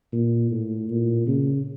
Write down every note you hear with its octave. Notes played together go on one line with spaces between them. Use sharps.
A#2
A2
A#2
C#3